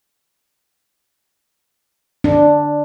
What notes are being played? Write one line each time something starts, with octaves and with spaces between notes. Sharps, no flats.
D4